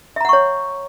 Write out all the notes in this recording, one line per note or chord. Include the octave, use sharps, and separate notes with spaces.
C#5 E5 F#5 A#5 C#6